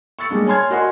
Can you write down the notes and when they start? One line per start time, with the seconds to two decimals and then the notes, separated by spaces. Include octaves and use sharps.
0.19 C#6 E6 A6 C#7
0.31 G3 G#3 A#3 D4
0.46 C#5 G#5 A5 C6 F6 G#6
0.71 F#4 A#4 D#5 F#5 G#5 C6